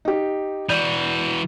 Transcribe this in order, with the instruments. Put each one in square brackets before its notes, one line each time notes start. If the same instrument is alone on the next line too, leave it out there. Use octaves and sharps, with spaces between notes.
[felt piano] D#4 G4
[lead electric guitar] E3 F#4 [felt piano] D5 G6